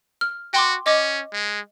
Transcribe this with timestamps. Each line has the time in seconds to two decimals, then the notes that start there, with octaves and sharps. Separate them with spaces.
0.21 F6
0.54 F#4 G5 C6 D6
0.86 C#4 D#5 D6
1.33 G#3